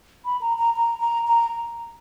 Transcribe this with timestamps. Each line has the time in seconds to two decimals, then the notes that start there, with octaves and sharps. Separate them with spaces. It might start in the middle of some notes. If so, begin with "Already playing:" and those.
0.25 B5
0.41 A#5
0.58 A#5
0.76 A#5
1.01 A#5
1.27 A#5